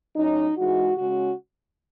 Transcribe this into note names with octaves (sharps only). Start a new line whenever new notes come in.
A2 F#3 C#4 D#4
G#2 E3 G#3 D#4 F#4
C#3 G#3 C#4 F#4